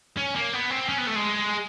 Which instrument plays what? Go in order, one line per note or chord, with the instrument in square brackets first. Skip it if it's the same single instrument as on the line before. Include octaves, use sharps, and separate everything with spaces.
[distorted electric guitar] C#4
A#3
B3
C4
C#4
B3
A3
G#3